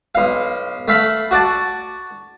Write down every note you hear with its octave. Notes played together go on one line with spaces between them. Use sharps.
B1 F5
A3 E5 F5 B5
F#4 D5 A5